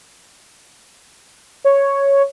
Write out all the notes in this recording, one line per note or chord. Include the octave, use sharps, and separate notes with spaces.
C#5